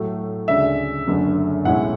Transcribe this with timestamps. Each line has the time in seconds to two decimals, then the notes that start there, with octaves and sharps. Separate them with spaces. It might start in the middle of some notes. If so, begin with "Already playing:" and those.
Already playing: A2 F#3 A3
0.48 D2 C#3 G#3 D4 E5
1.07 F#1 F#2 D3 A3
1.65 B1 A2 G#3 C#4 E4 F#5